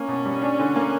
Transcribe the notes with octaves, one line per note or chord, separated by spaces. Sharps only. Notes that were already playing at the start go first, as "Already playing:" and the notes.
Already playing: A#3 C#4
B2
G3
D4
D3
A#3